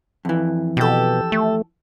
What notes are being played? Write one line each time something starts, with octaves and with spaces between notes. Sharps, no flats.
F2 E3
B2 G4 A4
A3